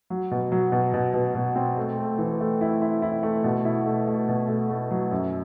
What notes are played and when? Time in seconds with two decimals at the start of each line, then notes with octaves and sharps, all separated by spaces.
0.10 F#3
0.31 B2
0.52 F#3
0.72 B2
0.94 B2
1.14 B2
1.35 B2
1.56 C4
1.77 A3
1.98 A3
2.18 E3
2.40 A3
2.61 E4
2.82 E4
3.02 E4
3.23 A3
3.44 B2
3.65 E4
3.86 A3
4.07 A3
4.28 B2
4.48 A3
4.70 A3
4.91 F#3
5.11 F#2